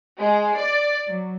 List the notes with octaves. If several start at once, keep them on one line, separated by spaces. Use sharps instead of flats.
G#3
D5
F#3